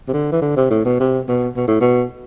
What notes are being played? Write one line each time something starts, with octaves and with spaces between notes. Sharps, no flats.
C3
D3
E3
D3
C3
A2
B2
C3
B2
B2
A2
B2